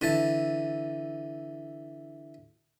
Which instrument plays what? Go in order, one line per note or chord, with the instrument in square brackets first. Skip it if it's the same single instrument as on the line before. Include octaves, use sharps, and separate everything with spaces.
[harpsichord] D3 E3 A5